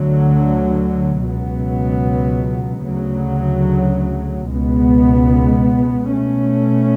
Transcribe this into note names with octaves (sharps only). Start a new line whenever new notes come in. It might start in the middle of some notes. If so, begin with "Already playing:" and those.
Already playing: D2 D3 F#3
C#2 B2 F#3 B3
D2 C#3 F#3
C#2 B2 G#3 B3
B2 A3 C#4